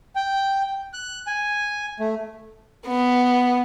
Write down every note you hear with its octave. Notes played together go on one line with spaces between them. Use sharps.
G5
F#6
G#5
A3
B3